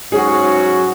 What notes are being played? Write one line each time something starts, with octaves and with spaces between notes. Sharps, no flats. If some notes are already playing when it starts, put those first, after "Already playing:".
G#2 F#3 C#4 F#4 G#4